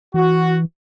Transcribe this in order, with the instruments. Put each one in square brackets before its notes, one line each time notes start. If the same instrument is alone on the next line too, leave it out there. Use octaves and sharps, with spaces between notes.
[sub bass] E3 [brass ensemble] F#4